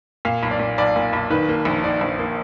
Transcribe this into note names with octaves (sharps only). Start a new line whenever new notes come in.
A#2 F5
B1
D5
A#2
B1 D5
A#2
B1
D#3 B4
A#3
A#1
D#3 D5
A#1
A#3